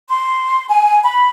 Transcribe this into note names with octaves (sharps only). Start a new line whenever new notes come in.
C6
G#5
B5